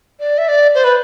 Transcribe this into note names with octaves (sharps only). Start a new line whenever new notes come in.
D5
E5
D5
C5
B4